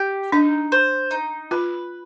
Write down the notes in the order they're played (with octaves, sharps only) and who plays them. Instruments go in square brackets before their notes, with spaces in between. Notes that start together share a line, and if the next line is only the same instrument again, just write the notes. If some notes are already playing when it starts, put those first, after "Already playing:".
Already playing: [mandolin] G4
[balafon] D4 [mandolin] D#4
[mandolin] C5
D#4
[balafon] F4 [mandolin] B4